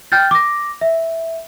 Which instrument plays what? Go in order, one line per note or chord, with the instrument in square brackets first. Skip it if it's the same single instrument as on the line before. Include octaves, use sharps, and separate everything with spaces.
[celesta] G5 F6 G6 A6
D6 A#6
E5